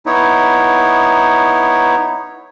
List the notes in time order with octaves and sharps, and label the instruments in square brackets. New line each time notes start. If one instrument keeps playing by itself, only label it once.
[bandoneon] B3 D#4 E4 C#5